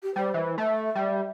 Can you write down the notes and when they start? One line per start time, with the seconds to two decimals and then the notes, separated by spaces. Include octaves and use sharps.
0.03 G4
0.16 G3 C5
0.34 E3
0.58 A3 E5
0.95 G3